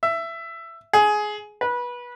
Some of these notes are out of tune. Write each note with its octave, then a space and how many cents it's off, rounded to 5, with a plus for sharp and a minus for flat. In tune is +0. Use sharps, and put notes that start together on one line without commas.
E5 +15
G#4 +15
B4 -20